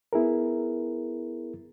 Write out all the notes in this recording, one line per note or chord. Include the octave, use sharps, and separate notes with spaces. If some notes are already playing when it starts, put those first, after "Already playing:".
B3 E4 G#4 A#4